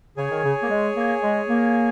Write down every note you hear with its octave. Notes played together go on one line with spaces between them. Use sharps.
C#3 G#4 C#5 G#5
D#3
C#3
A#3
G#3
A#3
G#3
A#3